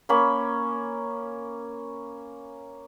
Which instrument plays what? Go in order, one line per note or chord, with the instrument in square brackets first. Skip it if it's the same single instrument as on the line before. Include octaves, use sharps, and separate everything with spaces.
[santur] A#3 C#4 B5